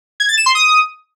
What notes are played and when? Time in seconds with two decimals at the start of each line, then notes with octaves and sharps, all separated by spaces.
0.20 G#6
0.29 A6
0.37 E7
0.46 C6
0.55 D#6